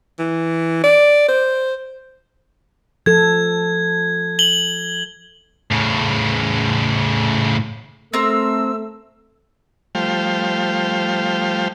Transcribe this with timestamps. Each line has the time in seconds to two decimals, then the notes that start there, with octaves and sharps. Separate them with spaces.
0.19 E3
0.84 D5
1.29 C5
3.06 F3 A4 G#6
4.39 F#7 G7
5.71 A2 C#3
8.14 A3 C4 A#4 E6
9.95 F3 G3 A3 C5 F5 G5